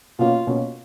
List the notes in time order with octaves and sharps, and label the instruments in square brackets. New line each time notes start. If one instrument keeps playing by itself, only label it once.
[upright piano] B2 A#3 C#4 [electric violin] F4
[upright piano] B2 A#3 C#4